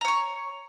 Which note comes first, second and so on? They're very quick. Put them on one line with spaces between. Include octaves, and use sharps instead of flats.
A#5 C#5 C#6